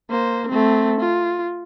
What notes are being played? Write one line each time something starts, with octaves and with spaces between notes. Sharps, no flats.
A#3 C5
A3 C4
F4